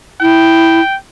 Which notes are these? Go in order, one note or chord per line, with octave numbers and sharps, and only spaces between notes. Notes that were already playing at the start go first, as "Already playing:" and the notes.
E4 G5